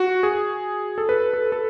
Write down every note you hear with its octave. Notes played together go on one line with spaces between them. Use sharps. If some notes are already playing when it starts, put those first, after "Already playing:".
Already playing: F#4
G#4
A4
B4
A4
A4